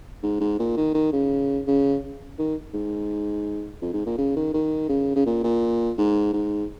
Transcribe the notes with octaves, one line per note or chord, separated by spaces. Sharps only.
G#2
G#2
A#2
D#3
D#3
C#3
C#3
D#3
G#2
F2
G#2
A#2
C#3
D#3
D#3
C#3
C#3
A#2
A#2
G#2
G#2